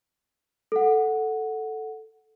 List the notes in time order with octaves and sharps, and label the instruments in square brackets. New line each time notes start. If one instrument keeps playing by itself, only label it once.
[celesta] A4 F#5